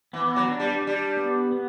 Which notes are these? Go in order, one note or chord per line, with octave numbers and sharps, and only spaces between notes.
E3 B3
E3
F#3
D4
G3
D4
G3
B3
B3